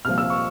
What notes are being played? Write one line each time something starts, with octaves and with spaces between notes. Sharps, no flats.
C2 A#2 F3 F6
E6
C#6